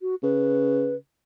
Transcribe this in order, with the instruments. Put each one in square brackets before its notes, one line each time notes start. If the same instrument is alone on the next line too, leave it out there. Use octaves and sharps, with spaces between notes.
[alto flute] F#4
[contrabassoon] C#3 [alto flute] B4